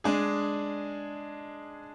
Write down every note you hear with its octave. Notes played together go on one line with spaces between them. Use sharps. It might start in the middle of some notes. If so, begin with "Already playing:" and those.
G#3 D4 G#4